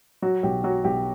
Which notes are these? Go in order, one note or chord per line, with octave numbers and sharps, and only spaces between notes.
F#3 F#4
B1 G4
F#3 F#4
B1 G4